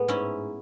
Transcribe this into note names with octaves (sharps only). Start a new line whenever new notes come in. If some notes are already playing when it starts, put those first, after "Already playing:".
Already playing: A2 G#3 B3
G#2 C#4 E4